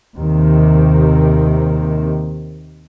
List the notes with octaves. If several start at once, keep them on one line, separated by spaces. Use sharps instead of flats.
D#2 C3 D#3